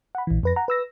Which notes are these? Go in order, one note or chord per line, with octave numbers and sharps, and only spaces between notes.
F#5 B5
A#1 E3
F2 B4 A#6
F#5 A#5
B4 E6 A#6